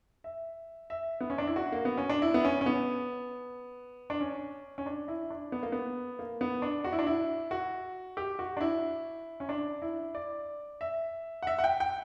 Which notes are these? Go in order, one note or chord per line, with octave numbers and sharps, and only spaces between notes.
E5
E5
B3
C#4
D4
E4
F#4
A#3
B3
C#4
D4
E4
B3
C#4
C#4
B3
D4
C#4
C#4
D4
E4
D4
B3
A#3
B3
A#3
B3
D4
F#4
E4
D4
E4
F#4
G4
F#4
D4
E4
C#4
D4
E4
D5
E5
F#5
E5
F#5
G5
G5